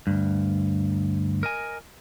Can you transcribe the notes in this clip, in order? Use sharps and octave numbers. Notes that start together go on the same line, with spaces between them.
D2 G2
A#4 D#5 G#5